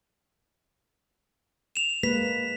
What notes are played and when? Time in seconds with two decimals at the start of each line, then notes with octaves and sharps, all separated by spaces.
1.76 E7 F7
2.03 G#3 A#3 B4 B6